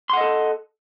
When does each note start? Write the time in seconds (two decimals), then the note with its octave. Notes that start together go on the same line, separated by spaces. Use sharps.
0.10 C6
0.13 F#5
0.17 D#5
0.21 A4